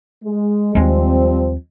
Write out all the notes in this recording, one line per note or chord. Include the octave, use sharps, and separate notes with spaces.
G#3
D#2 F3 G3 G#3 C4